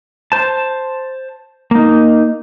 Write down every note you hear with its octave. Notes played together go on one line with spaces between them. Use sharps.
C5 A5
A#3 D#4